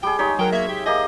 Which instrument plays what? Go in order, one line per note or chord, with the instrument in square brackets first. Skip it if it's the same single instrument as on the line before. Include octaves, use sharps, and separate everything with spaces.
[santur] G3 G#4 [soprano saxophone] G5
[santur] G#3 D#4 C#5 [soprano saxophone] G4
[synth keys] F#3 A#4 [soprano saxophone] G5
[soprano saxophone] A#3 [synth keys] E5 G#6
[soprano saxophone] G4
[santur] A#3 G4 G#4 [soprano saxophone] D#5